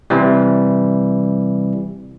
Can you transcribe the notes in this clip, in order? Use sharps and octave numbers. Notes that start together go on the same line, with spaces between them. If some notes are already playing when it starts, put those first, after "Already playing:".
C3 E3 G3